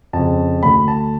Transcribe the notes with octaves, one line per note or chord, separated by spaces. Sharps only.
F2 C#3 A5
D2 D3 B5
A5